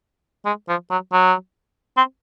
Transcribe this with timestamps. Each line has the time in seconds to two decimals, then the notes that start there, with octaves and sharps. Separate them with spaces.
0.45 G#3
0.68 F3
0.90 F#3
1.12 F#3
1.97 C4